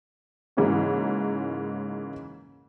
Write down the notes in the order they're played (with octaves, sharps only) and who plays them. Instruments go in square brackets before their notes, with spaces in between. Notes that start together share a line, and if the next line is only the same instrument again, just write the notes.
[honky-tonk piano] G#2 C#3 E3 A#3 C#4 F#4